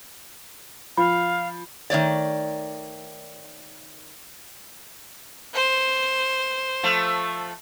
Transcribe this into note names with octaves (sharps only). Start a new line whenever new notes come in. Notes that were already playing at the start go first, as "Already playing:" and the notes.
F3 F5 B5
D#3 A3 C#5 D5
C5
F3 A3